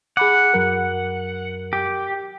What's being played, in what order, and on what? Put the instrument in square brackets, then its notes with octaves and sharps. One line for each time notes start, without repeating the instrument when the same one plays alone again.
[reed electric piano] G#4 B5 D6 [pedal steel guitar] F#5
[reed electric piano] F#2 F#3 A#4
[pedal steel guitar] G4